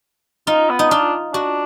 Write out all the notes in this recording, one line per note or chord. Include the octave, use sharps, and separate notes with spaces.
D#4 F4
B3
D#4
D4 F4
D4 F#4